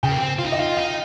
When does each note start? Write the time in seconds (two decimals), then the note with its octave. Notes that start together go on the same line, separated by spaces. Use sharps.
0.03 C#3 G5
0.11 A#3
0.18 C4
0.39 F4
0.44 D#4
0.52 D#5
0.58 F4 F5
0.76 D#4 F5